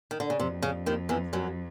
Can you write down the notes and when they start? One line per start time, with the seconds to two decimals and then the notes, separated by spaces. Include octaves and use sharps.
0.11 D#3
0.20 D3
0.30 C#3
0.40 F2 C3
0.62 C#3
0.86 D#2 D#3
1.09 E2 E3
1.33 F#2 F#3